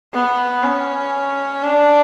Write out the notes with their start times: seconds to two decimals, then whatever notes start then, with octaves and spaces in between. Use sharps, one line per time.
0.14 B3
0.64 C#4
1.64 D4